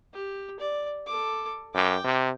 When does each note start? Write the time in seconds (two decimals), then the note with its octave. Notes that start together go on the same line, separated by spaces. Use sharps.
0.13 G4
0.59 D5
1.07 A4 D6
1.74 F#2 G5 D6
2.04 C3